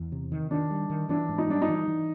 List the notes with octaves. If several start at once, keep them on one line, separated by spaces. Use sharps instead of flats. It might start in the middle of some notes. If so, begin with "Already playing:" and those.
Already playing: E2
C3
D#3
D#3 D4
G3
D#3
E3 D4
G#2
D#4
G3 D4
D#4
E3
E3